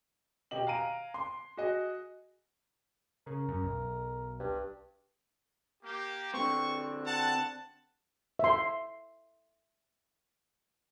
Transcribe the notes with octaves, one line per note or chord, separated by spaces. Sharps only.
B2 G4 D#5 F#7
F5 G#5 A#5 D7 D#7
C6
F#4 G#4 D#5
C#3 A#4
F#2
B1
G2
A#3 G4
D3 C4 C#6
F#5 A5
E5 C6